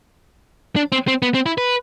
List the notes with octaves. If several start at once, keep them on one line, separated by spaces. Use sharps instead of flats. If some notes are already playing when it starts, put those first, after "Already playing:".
D4
C4
C4
B3
C4
E4
B4